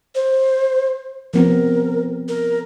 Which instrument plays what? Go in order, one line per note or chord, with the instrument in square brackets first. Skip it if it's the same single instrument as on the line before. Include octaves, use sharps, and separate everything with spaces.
[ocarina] C5
[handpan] F3 B3 C4 [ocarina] A#4
[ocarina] A#4